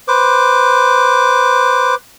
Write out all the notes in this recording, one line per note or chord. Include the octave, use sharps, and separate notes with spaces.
B4 C5 D6